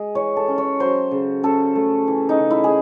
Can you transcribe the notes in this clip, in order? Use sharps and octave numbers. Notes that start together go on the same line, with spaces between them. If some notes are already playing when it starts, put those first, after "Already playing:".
Already playing: G#3 G#4
E3 C#5
A4
C#4
C#5
F#3 C5
C#3
C#3 A4
A3
E3
D#4
C#3
E4
G#4